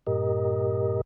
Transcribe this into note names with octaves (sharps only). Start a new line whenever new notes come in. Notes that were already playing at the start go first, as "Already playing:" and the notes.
G2 A#2 G4 A#4 D#5